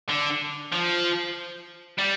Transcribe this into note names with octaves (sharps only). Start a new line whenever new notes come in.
D3
F3
G3